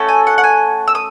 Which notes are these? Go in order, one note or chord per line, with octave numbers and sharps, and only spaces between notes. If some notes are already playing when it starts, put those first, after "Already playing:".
Already playing: A3 C#4 F#4 A4
G#5
F#5
F#5
G#5
E6
D#6